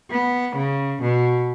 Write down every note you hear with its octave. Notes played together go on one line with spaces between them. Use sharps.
B3
C#3
B2